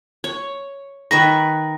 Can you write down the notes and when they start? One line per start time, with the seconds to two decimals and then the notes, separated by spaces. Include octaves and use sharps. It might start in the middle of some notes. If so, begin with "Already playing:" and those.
0.24 C#5
1.11 D#3 B4 C#6 A#6